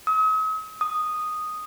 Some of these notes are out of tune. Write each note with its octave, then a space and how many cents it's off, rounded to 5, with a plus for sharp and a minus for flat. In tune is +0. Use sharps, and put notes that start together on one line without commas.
D#6 +45
D#6 -5